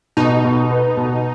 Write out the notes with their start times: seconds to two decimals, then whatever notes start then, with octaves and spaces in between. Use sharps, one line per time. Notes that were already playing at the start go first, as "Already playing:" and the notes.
0.17 B2 D#4
0.44 B2
0.70 B3
0.97 B2